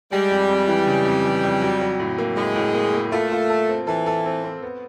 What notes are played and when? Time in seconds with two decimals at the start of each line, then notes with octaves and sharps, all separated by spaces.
0.12 G3 G#3
0.30 F2
0.49 F2
0.67 E3
0.87 C#3
1.05 F2
1.25 E3
1.43 F2
1.62 F#3
1.81 F#3
2.00 A2
2.18 A#3
2.37 A2 G#3
2.56 A2
2.74 A#3
2.94 A#3
3.12 A3 F4
3.32 F4
3.50 A4
3.69 C4
3.87 E3 A4
4.06 A4
4.25 C4
4.44 C4
4.62 B3